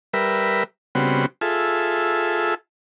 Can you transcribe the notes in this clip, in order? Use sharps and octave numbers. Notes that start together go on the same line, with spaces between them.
G3 A#4 B4 E5
C#3 G3 B3 C4 F#4
F4 G#4 A4 E5